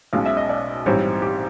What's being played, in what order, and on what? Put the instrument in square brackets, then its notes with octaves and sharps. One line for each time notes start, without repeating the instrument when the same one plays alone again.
[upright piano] B1 B2 G#3 C#4 F5
E5
D#5
D5
A#1 G#2 E3 G3 C4 C#5
G4